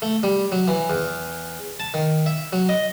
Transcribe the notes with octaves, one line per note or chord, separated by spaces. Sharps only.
A3
G3
F#3
E3
E2
A5
D#3
E5
F#3
D#5